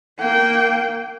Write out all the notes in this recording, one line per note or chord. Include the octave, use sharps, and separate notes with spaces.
A#3 G5